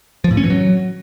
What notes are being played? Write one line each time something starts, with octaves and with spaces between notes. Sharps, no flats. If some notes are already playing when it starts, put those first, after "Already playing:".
F3
A2
C#4
E3
F#3